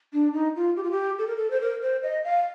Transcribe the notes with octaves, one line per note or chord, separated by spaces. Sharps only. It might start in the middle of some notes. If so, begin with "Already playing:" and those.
D4
D#4
F4
G4
F4
G4
A4
A#4
A4
C5
A#4
C5
D#5
F5